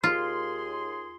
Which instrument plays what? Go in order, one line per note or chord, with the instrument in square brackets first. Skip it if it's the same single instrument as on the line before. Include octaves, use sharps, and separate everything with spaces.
[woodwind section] D#2 G#4 C6 [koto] F4